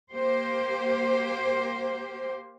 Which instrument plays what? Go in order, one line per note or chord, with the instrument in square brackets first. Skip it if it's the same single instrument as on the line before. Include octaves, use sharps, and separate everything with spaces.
[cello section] A#3 G4 C5